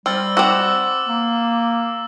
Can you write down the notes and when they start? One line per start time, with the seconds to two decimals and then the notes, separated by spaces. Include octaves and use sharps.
0.06 G3 C4 E6 F6 A6
0.37 C4 F#4 D6 E6
1.07 A#3